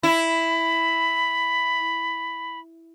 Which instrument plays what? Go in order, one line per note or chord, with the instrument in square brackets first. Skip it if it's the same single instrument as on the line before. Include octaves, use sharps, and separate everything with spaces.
[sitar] E4 [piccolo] B5